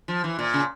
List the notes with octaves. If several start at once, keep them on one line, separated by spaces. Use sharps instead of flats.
F3
E3
A#2
C#3